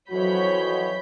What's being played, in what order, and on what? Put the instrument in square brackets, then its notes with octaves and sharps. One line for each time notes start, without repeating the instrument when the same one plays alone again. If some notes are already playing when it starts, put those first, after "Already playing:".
[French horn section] F2 E3 F#4 [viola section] F#3 C#5 [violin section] B5 G6 B6